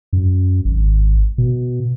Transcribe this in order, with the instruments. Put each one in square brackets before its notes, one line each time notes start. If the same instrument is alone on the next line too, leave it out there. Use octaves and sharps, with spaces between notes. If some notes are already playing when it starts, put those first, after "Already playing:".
[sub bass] F#2
G#1
B2